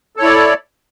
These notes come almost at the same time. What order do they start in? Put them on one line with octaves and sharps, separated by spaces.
A4 C#5 E4 D5